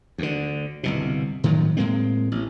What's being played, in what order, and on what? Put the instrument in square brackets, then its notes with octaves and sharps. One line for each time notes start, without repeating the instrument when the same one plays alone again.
[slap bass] D2 D3
G1 C2 B2
A2 D#3 F3 F#3
A2 G#3 A#3 C4
A1